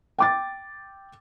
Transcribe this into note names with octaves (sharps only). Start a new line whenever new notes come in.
G5 D6 A6